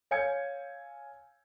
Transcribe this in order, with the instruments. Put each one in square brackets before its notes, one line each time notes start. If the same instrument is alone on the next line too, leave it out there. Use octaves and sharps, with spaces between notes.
[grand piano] C#5 F5 G#5 G6 G#6 C#7